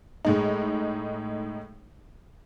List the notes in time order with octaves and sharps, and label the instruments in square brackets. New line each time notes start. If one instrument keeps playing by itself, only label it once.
[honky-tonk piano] A2 G#3 D#4